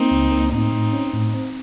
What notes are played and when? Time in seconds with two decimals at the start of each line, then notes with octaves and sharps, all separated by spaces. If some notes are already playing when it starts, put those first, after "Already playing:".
Already playing: A#3 C4 D#4
0.11 C#2
0.31 A#3
0.52 A2 C4 D#4
0.72 A2
0.93 C#4
1.13 A2
1.34 C4